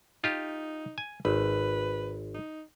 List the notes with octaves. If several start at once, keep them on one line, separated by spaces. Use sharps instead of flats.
D#4 F4 G4
G#5
G#1 B4
D#4